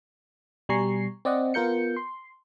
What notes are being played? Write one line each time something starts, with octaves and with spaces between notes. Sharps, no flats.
B2 G3 G#5 A#5 C#6 C7
C4 D5 D#5 F#5
B3 F4 A#4 G6 C#7
C6